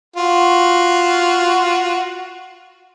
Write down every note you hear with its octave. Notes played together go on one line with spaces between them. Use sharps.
F4 F#4